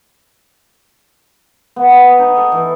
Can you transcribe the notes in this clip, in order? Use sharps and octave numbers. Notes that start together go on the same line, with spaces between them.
B3
D#5
D#4
A4
E3